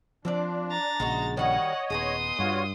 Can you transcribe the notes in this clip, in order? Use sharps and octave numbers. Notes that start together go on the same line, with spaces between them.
F3 C4 D4 F4 D5
A#5 A6
A#1 C#3 G#3 D#4 F#4
D#3 G3 F#4 C#5 D#5 F#5
D#1 B3 D#4 G#4 C6 D#6
G2 F4 F#4 C#5